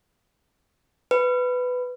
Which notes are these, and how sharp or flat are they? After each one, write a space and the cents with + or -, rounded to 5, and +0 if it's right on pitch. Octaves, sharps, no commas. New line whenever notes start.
B4 +10